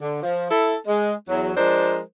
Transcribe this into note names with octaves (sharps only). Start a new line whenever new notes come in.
D3
F3
E4 A4
G#3
E2 F#3
F3 G#3 D4 A#4 C5